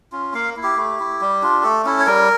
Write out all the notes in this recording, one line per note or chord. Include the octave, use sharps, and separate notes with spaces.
C#4 F4
A#3 F5
E4
G4
A3
E4
G3
D4 F4
A3 A4
C#4 E4 A4
C#5
G3 A#4